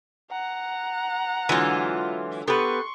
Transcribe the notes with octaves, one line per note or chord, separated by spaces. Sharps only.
F#5 A#5
D3 E3 F#3 G#3 F4
B3 G4 A4 B4 C6 C#6